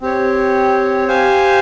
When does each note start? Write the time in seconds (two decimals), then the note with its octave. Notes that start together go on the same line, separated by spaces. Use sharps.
0.01 C4 G4 C#5
1.07 G4 C5 F5 G#5